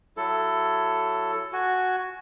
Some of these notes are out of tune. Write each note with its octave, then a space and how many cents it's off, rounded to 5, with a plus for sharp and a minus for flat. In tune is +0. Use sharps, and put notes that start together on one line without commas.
F#3 +10 E4 +25 A4 +10
F#4 +0 G#5 +10